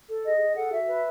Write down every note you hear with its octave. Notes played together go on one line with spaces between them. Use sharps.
A4
G#4 D#5
G#4
A4 F#5
F#4 E5
B4